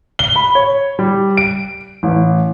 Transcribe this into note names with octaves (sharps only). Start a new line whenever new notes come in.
G7
B5
C#5
G3
D7
A1